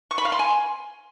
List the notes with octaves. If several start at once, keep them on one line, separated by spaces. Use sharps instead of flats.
C#6
B5
F5
C6
G#5